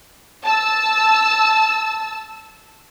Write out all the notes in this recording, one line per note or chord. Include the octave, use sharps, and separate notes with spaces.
A5 E6